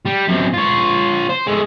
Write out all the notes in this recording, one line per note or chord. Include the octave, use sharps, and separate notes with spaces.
G3
F#2 C4
F4 C#5
C5
G#3 A3